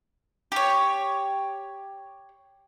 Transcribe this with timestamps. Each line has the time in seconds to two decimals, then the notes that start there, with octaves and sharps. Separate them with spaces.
0.52 G4 C#5